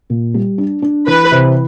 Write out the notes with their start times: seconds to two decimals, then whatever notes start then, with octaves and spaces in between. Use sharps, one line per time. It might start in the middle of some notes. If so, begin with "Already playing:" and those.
0.10 A#2
0.34 G3
0.58 D4
0.82 D4
1.07 E3 B4
1.31 C3